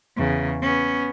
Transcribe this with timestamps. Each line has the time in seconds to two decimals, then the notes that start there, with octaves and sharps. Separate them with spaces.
0.16 E2 C#3
0.62 B3 C#4